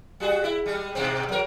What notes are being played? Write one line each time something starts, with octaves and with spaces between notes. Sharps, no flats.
G3 F#4 G#4
E4
G3 G#3
G#2 B2 C4
F#3 A#4